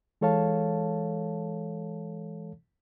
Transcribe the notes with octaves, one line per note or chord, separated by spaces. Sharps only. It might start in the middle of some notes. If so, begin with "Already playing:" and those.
E3 G#3 A4 C#5 F5 A5